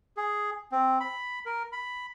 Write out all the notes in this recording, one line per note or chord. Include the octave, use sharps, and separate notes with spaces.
G#4
C4
B5
A#4
B5